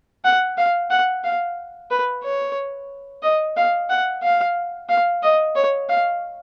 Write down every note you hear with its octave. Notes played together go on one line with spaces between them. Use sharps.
F#5
F5
F#5
F5
B4
C#5
D#5
F5
F#5
F5
F5
D#5
C#5
F5